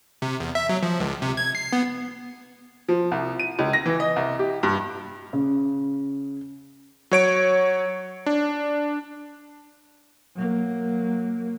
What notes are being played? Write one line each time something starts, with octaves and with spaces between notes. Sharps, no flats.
C3
E2
E5
F#3
F3
C#2
C3
G#6
C7
B3
F3
C2
D#7
C#2
A#6
E3
D#5
C2
G4
G2
C#3
F#3 C#5 D7
D4
F#3 A#3